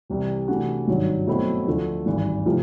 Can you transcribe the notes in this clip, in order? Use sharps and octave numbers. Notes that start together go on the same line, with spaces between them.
C2 C3 E3 G3
C3 E3 A3 D4 F#4
G#1 G2 D#3 F#3
B2 F#3 A3 C4 E4
D2 D3 F3 A3
G#1 G2 E3
C3 F3 A3